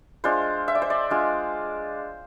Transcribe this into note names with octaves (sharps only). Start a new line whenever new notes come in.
G#3 D4 F4 C5
E5
D5
C5
D5
G#3 D4 F4